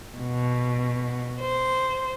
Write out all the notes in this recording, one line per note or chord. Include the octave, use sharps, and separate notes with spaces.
B2
C5